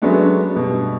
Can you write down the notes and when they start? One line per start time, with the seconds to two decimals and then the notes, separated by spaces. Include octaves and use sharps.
0.02 F#3 G#3 A3 B3 C#4 D4
0.55 G2 B2